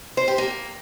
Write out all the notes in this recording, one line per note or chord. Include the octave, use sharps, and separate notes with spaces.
C5
G4
A#3